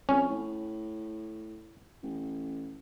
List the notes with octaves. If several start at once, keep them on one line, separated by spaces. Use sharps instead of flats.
F2 C#4
A2
A1